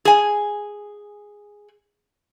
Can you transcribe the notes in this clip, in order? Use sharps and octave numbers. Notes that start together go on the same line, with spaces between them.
G#4 G#5